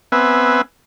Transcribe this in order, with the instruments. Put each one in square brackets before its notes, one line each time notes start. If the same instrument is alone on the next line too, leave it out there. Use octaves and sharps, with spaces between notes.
[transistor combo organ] B3 C4 B4 E5 F#5 G#5